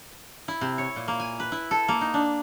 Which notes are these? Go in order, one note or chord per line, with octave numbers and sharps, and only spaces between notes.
E4
C3
C#5
A#2
A#3
G#5
B4
E4
A4
A#3
D#4
D4